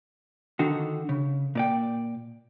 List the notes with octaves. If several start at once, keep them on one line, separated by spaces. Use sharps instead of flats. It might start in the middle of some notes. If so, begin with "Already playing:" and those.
D3 D#3 D#4 F#4
C#3
A#2 D5 G5